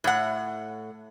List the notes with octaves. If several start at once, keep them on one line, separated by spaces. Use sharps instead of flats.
A2 F#5